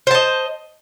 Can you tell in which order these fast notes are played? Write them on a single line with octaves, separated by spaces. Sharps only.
C5 A5 D#5